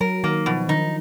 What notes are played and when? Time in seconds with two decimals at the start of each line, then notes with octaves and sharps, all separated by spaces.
0.01 F#3 A#4
0.23 D#3 A#3
0.46 B2 F3
0.68 D#3 D#4